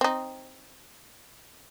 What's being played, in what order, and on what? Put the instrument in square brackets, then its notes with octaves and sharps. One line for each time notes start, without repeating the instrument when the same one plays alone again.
[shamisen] C4 D#4